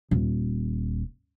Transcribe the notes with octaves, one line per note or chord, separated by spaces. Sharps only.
D#1